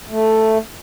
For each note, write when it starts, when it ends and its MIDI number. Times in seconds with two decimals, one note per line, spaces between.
0.10 0.58 57